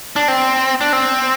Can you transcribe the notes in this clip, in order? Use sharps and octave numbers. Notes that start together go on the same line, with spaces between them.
D4
C4
D4
C4